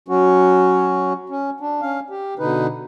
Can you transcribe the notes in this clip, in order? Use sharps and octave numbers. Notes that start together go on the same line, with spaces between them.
F#3 C#4 F#4
C#4
D4
C#4 F5
G4
B2 D3 D#4 B4